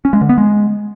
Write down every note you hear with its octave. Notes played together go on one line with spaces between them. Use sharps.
C#4
G#3
D3
B3
G#3